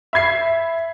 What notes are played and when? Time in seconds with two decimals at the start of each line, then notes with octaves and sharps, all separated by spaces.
0.13 E5 B5 G#6 C7